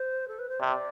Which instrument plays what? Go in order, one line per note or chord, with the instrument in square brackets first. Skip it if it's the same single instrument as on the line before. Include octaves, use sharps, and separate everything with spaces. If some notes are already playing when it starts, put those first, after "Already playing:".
Already playing: [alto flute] C5
A4
B4
C5
[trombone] C3 [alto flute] D5